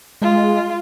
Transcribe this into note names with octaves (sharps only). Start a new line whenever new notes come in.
G#3 F4